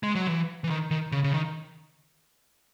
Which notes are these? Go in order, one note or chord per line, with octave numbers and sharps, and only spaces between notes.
G#3
F#3
E3
E3
D#3
D#3
C#3
C#3
D#3